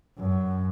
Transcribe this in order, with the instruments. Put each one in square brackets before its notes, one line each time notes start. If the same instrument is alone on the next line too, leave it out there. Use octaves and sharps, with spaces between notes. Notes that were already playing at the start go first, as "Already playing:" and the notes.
[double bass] F#2